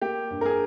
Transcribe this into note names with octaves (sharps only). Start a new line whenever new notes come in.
A#3 G4
G2
A#4
G#4